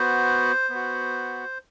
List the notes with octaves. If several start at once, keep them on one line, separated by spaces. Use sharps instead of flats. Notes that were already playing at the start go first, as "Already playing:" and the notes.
Already playing: B3 F#4 C5
B3
F#4